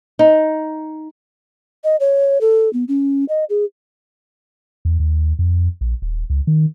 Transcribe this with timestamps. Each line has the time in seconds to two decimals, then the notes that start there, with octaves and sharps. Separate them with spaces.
0.19 D#4
1.84 D#5
2.00 C#5
2.41 A4
2.73 B3
2.88 C#4
3.29 D#5
3.50 G#4
4.85 E2
5.00 D#2
5.39 F2
5.81 A#1
6.02 D#1
6.30 C#2
6.47 D#3